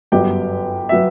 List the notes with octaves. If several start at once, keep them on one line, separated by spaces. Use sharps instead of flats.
G1 F#2 F#3 B3 G4 G5
F#3 B3 E5